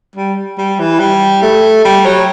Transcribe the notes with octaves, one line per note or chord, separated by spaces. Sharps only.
G3
G3
E3
G3
A3
G3
F#3